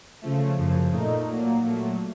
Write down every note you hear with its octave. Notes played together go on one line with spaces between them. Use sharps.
C#3 F3 A3
F#2 C#3 F3
A#2 A3 D#4
A#2 F#3 A#3
A#2 F#3 A3